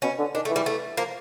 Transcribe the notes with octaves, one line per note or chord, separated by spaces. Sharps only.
B2 C#4
D3
D#3 D4
A3
E3
G3
A3
F3 A#3